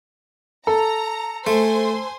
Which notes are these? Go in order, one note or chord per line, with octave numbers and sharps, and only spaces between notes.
A4 A#5
A3 C5 G#5 C6